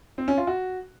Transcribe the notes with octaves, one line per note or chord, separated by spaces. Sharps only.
C4
C#4
F4
F#4